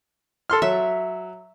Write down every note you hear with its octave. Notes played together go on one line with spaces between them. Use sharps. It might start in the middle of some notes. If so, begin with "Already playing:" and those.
A4 C6 F6
F#3 E5